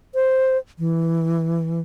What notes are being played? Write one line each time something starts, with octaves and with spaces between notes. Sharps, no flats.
C5
E3